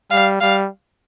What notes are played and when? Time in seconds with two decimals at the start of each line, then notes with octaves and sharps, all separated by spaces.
0.11 G3 F5
0.41 G3 F5